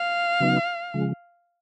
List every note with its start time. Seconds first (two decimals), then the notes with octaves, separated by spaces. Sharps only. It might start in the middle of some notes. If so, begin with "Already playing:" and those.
Already playing: F5
0.40 C#3 F#3 B3 D#4
0.94 C#3 F3 G#3